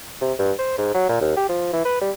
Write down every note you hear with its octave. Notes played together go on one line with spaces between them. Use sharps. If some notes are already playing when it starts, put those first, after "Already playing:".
C3
G2
C5
G#2
F#3
A#2
D#2
G4
F3
E3
B4
G3